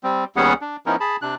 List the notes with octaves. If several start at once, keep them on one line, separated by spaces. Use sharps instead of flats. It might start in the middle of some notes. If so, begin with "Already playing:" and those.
G3 C4
D#2 G3 B3 C#4 G#4 F#5
D4
F3 B3 C#4 D#4 E4 A#4
G#4 A5 B5
C3 D4 F#6